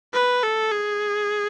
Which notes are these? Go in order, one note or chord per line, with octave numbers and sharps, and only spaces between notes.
B4
A4
G#4